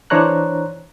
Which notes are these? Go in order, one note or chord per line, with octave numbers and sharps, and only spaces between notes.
E3 D4 C5 C#5 A#5 F#6